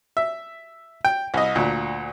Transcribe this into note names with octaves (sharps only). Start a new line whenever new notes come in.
E5
G5
C2 D#5
D2 A#2